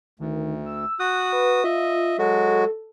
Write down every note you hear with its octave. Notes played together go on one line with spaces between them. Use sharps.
D2 D#3
E6
F#4 D#6 F#6
B4
F4 D#5 E5
F#3 G#3 F#4 A4